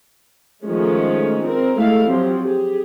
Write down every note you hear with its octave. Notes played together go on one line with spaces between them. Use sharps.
D#3 F3 G#3 A3 C#4
C4 A#4
G#3 A3 E4 A4 F5
F3 F#3 C4 G4
G4 G#4